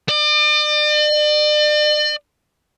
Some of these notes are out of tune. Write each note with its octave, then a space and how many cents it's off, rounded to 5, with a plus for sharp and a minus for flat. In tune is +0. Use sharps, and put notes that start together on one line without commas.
D5 +40